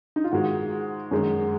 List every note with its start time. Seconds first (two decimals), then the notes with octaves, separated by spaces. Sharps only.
0.16 D#4
0.24 F4
0.32 G#2 D#3 G#3 F#4
1.11 F#2 D#3 G#3